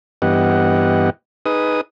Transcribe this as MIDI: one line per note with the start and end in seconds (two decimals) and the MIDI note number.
0.22 1.10 43
0.22 1.10 52
0.22 1.10 59
0.22 1.10 67
0.22 1.10 75
0.22 1.10 78
1.46 1.81 63
1.46 1.81 68
1.46 1.81 71
1.46 1.81 87